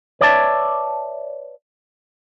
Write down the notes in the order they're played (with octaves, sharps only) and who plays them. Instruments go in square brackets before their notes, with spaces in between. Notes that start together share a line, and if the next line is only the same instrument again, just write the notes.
[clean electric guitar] B4 C#5 D5 E5 G#5 A5